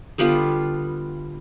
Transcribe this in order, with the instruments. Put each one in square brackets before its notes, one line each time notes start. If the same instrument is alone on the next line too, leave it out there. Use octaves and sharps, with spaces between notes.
[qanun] D3 G3 B3 F4